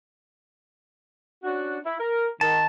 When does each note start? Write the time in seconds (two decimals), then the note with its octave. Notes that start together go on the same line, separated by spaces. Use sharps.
1.44 C#4 D4 F#4
1.85 E4
2.00 A#4
2.41 D#3 A5